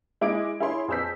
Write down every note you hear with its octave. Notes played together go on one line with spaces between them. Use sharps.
G#3 E4 D#5 D6 D7
E4 G#4 C#5 B5 C6
F2 G#4 B4 E6 G6 B6